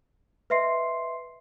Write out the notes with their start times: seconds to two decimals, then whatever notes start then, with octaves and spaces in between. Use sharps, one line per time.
0.50 B4 D#5 E5 C6 C7